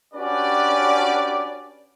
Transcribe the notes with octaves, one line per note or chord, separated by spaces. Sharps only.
C#4 D4 F#4 G4 B4 D5